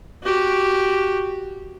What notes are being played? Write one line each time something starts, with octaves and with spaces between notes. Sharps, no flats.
F#4 G4